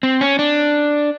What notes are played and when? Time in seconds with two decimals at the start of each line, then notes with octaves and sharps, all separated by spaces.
0.03 C4
0.21 C#4
0.39 D4